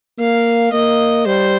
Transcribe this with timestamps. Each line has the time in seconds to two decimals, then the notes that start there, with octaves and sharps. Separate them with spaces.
0.19 A#3 F5
0.73 A#3 D#5
1.26 G3 C5